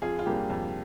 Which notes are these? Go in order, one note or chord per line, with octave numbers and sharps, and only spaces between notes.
F2 F4 G#4
F4
C3 G3 A#3 D4 G4
F2